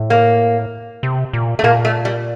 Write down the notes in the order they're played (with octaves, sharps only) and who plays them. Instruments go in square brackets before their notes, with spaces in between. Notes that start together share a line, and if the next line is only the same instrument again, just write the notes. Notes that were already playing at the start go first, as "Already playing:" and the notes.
Already playing: [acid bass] A2
[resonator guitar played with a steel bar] A#3
[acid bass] C3
A#2
[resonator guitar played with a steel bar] A3
[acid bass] A#2 [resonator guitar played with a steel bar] A#3
[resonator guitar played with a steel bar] A3
G3